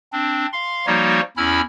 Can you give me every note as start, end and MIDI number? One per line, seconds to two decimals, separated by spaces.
0.13 0.46 60
0.13 0.46 62
0.53 0.86 77
0.53 0.86 84
0.87 1.21 53
0.87 1.21 55
0.87 1.21 58
0.87 1.21 63
0.87 1.21 66
0.87 1.21 73
1.37 1.61 40
1.37 1.61 61
1.37 1.61 64
1.37 1.61 83
1.37 1.61 88
1.37 1.61 89